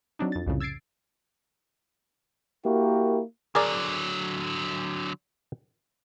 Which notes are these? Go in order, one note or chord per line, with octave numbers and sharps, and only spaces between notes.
F#3 C4 D4 D#4
F2 A6
C2 F2 A2 C#3
E6 G#6 A6 C7 D7
A#3 E4 F#4 G4 A#4
D3 F#3 G#4 A#4 D5